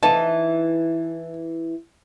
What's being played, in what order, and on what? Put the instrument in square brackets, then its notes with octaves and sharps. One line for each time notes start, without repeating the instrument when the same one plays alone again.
[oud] E3 D#4 [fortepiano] A5